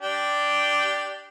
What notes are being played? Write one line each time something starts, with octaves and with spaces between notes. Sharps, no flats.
D4 G4